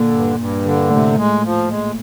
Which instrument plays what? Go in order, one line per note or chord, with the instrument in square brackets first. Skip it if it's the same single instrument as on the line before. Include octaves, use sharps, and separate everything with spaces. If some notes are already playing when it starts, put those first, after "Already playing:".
Already playing: [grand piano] A#2 [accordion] D3
[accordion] G2
G2
D3
[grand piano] A2 [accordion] C3
[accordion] G#3
F3
G#3